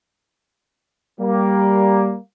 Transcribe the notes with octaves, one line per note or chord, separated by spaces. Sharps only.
G3 A#3